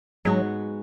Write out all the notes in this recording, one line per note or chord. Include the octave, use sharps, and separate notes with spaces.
G#2 F#3 G#3 B3 F#4